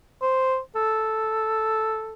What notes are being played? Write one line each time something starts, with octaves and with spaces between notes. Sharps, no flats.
C5
A4